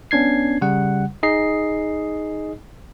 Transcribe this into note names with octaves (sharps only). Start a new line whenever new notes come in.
B3 C#4 D4 G#6 C7
C#3 G3 F#5
D#4 G#4 D#5 C7